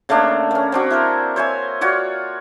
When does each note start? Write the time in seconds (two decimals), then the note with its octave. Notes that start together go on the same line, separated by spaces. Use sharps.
0.09 C#3 A3 A#3 D4
0.51 A#3 C#4
0.72 C4 D4 F#4
0.90 E4 A#4 C5
1.36 C5 C#5 E5 G#5
1.81 F4 F#4 C#5 D5